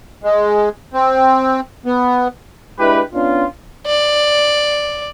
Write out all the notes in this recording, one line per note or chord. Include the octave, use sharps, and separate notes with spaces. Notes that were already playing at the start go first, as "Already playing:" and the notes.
G#3
C4
B3
G#3 D4 E4 G4 B4
B3 C#4 D4 F4
D5